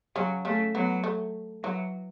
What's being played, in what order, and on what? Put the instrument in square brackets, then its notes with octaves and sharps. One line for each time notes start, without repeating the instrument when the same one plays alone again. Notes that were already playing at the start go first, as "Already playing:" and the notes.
[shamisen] C#3 C#4 [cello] F#3
[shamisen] C#3 C#4 [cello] A3
[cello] F#3 [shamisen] B3
[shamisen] A3
[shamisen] E3 [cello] F#3